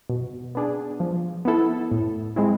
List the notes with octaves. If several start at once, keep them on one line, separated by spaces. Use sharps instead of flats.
B2
B3 D4 G#4
F3
B3 E4 A4
A2
G#3 C4 E4